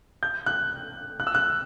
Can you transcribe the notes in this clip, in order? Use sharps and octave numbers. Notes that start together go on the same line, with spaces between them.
G6
F#6
F#6
E6
F#6